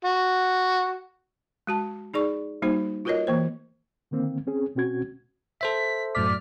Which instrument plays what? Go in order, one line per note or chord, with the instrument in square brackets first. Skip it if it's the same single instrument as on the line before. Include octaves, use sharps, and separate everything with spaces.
[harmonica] F#4
[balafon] G#3 F#4 A5
D#4 G#4 D5 C#6
G3 A#3 D#4 F#4 C5
F4 F#4 A#4 B4 C#5 D#5
E3 A#3 C5
[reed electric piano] D3 D#3 A#3 C4
C4 C#4 G#4
B2 C4 C#4 F#4 G#6
[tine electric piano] A4 C5 E5 [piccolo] B6
[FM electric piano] F#2 A2 B6 [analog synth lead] D5 [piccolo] F6